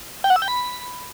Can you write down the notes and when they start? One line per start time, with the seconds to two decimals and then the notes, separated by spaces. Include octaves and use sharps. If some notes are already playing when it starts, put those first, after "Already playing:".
0.24 G5
0.30 F#5
0.36 E6
0.42 G5
0.48 B5